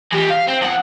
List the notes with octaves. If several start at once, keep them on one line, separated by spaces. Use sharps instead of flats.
E3 G4
F5
C4
F2 F#5